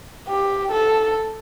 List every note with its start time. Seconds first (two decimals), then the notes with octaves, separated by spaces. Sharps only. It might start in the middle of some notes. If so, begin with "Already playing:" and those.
0.28 G4
0.71 A4